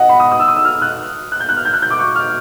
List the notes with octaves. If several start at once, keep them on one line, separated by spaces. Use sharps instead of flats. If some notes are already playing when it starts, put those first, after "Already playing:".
Already playing: D#5 F#5
B5
D#6
D#6
E6
D#6
E6
F6
F#6
F#6
G6
F#6
F6
G6
F#6
G6
D6
C#6
F6